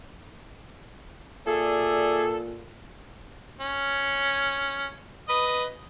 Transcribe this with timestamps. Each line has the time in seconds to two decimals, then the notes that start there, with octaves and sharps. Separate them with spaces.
1.46 A#2 G#4 A4 D5 E5
3.60 C#4
5.29 B4 D#5